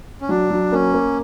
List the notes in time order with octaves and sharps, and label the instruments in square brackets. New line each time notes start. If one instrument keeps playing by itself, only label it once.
[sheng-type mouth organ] C#4
[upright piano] F#3 [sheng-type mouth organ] D4
[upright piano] F#3
[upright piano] A#3 [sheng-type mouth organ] C#4
[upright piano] A#3